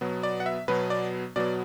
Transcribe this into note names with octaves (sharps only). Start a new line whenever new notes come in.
B2 F#3 B3
D5
F#5
E5
B2 F#3 B3 B4
D5
B2 F#3 B3 D5